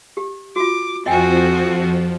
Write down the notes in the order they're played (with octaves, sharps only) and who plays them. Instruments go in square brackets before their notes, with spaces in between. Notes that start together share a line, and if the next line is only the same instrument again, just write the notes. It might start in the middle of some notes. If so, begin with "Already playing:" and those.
[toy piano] G4
[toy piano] F4 F#4 [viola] D6
[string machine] F2 F3 [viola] C4 F#4 [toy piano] D#5 G5 G#5